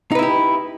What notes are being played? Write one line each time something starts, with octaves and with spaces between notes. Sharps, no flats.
D#4 E4 G4 B4